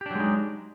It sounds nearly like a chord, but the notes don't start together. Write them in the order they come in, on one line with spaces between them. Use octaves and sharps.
G4 D4 F#3 G#3 D#4